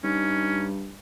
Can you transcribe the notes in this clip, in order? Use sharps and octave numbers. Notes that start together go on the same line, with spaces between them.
G2 C#4 D#4